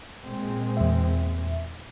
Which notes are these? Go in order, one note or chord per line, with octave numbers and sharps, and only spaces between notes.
A#2 G#3 C4
E2 E5